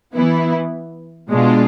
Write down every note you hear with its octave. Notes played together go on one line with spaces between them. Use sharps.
E3 B3 E4
B2 G#3 D4 F4